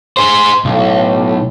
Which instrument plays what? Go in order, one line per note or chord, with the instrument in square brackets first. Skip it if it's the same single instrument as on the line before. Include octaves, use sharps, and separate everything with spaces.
[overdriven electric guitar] G#4 C5
[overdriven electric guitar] B1 [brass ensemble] A2